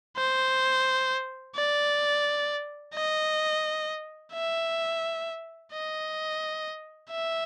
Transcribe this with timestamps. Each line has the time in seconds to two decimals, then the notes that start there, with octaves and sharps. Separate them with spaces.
0.17 C5
1.56 D5
2.95 D#5
4.33 E5
5.73 D#5
7.11 E5